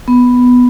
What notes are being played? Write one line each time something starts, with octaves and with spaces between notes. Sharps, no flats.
B3